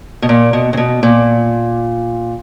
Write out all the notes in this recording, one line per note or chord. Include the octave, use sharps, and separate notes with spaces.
B2
A#2
B2
C#3
B2
A#2